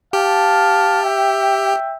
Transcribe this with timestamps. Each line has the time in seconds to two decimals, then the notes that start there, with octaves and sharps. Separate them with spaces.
0.13 G4 F5 A5
1.03 E5 G5